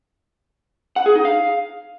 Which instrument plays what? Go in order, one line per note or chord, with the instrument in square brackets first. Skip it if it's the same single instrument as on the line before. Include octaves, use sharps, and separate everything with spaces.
[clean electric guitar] F#5
G#4
D#4
F5